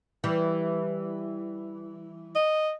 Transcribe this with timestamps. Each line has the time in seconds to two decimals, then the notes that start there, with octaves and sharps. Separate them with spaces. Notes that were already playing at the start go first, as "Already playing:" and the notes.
0.24 E3 G3
2.36 D#5